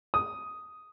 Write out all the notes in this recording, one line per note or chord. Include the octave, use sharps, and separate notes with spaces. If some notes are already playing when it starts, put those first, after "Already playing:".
D#6